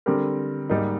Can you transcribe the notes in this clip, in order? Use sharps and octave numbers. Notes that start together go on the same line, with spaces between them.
D3 G3 C4 G4 A#4
G#2 G3 A#3 D#4